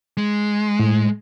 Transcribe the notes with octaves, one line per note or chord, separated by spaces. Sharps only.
G#3
A2